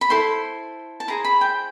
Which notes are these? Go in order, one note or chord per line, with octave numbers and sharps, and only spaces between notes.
B5
E4 A4 C5 C6
A5
E4 G#4 C5 A#5
B5
G5